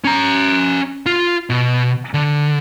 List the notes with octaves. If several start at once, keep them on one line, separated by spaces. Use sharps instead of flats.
C#4 A#5
F4
B2
D3